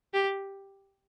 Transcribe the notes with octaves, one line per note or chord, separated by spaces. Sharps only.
G4